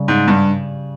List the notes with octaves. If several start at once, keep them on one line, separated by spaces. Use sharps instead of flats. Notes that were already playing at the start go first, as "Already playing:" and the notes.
Already playing: C#3 G3
G#2
G2